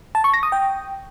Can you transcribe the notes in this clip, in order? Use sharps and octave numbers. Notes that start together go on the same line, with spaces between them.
A5
C#6
A#6
D#6
G5